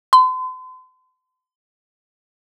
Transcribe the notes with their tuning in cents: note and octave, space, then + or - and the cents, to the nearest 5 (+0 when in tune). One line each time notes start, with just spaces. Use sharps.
C6 -40